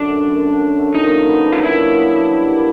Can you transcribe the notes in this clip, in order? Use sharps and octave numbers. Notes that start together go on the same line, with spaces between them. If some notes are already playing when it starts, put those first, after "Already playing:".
Already playing: F#2 D3 F#3 D4
A3
F#2
D3
F#3
A3
A#2 D#4
F#3
B3
D4
F4
A#2 E4
F#3
B3
D4
G3
A#3